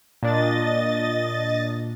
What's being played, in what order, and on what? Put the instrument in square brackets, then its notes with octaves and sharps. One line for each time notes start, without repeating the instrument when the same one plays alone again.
[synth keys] A#2 D4 [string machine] D#5 A6